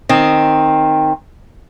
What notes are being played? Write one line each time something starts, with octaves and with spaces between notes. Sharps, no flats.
D#3 C4